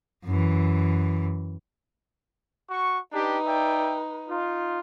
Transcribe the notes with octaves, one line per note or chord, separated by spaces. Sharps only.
F#2 E3
F#4 C#6
D4 D#4 G4 B4
D5 E5 G5
D#4 F4